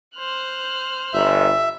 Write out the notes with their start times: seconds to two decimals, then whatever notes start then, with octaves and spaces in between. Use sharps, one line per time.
0.17 C5 F6 F#6
1.13 G1 E5